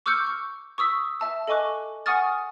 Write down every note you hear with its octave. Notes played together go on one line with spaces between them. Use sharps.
C#6 D6 E6 F6 G6 C#7
C#6
C#6 D#6 E6 B6
E5 A5 E6
A4 D#5 G#5 C#6 D6 F#6
F#5 G#5 C#6 D#6 F6 A6